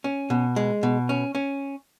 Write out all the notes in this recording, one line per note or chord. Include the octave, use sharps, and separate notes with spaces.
C#4
B2
G#3
B2
C#4
C#4